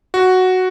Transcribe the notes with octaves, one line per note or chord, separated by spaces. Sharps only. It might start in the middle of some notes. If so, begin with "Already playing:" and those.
F#4